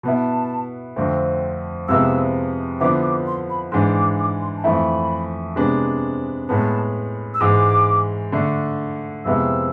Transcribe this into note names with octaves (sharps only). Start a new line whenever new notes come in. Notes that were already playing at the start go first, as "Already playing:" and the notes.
B2 B3 E4 A5
F2 D3 A3 C4
F2 C3 G#3 B3 E4 E6
D3 F3 B3 E4 D6
D6
C6
B5
G#2 E3 G#3 D4 C6
D6
D6
C6
A5
F2 E3 A3 E4 B5
C3 G#3 B3 D4
A2 G#3 B3 A5
E6
G#2 E3 G#3 D6
D3 A3 D4
F2 C3 G#3 B3 E4 E6